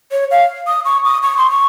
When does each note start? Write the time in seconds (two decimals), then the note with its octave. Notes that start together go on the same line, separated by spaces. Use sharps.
0.12 C#5
0.31 F5
0.67 D#6
0.85 C#6
1.05 D#6
1.23 C#6
1.37 C6
1.50 C#6